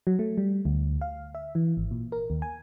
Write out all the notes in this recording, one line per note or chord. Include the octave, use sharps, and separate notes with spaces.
F#3
A3
G3
D2
F5
E5
E3
G#1
A#2
A#4
D#2
G#5